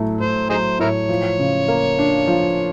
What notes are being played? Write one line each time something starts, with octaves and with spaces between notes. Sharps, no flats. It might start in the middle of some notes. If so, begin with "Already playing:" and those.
Already playing: A2 F#3 A3
A2 C5
F#3 D#4 G#4 C5
A2 E4 A#4 C#5
F3
C#3
A#3
D4
F3